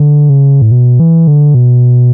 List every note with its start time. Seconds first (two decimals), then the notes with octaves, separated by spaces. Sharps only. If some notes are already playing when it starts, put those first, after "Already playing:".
Already playing: D3
0.29 C#3
0.62 A2
0.72 B2
1.00 E3
1.27 D3
1.55 B2